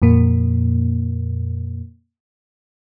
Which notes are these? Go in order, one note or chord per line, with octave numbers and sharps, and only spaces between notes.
F2 A#2 A#3